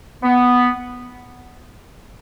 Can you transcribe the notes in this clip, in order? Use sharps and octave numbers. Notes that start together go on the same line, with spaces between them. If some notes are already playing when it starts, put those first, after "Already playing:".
B3